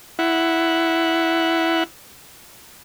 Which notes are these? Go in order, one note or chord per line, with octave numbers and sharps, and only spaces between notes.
E4 F#5